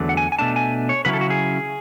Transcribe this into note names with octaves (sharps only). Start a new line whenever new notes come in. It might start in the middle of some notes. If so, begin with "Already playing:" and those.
Already playing: E2 D3 F#3 A3
F#5
G#5
G#5
B2 A3 D4 A5
G#5
C#5
C#3 F#3 C#4 E4 B4
A4
F#4
G#4